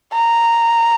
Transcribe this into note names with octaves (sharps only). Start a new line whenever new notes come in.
A#5